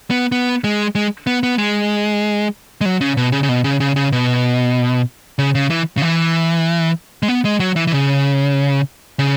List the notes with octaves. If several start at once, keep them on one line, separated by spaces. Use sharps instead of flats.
B3
B3
G#3
G#3
B3
B3
G#3
G#3
F#3
C#3
B2
C#3
C#3
B2
C#3
C#3
C#3
B2
C#3
C#3
E3
C#3
E3
G#3
B3
G#3
F#3
E3
E3
C#3
C#3